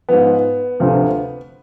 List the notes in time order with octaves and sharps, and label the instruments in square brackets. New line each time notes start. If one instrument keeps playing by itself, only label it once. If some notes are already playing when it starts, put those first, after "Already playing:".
[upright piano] G#2 F3 B3
D2 C3 F3